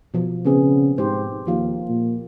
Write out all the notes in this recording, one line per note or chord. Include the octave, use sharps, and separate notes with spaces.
B2 F3
C#3 B3 C4 G#4
G#2 G4 C5
D#2 F3 A#3 F4
A#2